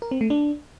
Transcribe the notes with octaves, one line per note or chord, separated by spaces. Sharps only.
A#4
C4
A3
D4